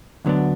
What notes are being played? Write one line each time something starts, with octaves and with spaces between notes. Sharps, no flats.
D2 D3 F#3 B3 D4